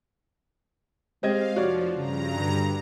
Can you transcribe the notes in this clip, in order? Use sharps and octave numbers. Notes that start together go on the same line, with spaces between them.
G#3 C4 G4 D#5 F5 G#6
F1 F3 F#4 C#5 D5
G2 C#3 A#5
D3